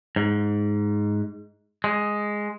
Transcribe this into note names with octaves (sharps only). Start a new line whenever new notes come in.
G#2
G#3